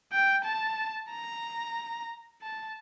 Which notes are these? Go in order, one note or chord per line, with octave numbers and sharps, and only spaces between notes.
G5
A5
A#5
A5